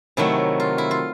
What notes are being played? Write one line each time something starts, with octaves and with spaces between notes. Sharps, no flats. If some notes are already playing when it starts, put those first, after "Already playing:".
C3 D#3 F#3 A3 E4
F4
E4
F4